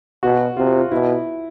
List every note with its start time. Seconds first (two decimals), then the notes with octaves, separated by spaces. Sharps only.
0.23 B2 F#4
0.57 C3 F4
0.80 F4
0.91 B2 E4